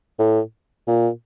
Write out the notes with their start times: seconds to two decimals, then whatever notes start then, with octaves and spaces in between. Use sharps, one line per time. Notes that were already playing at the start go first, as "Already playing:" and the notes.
0.19 A2
0.88 A#2